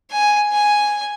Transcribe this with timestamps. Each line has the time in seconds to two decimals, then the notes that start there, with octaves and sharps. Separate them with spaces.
0.11 G#5
0.52 G#5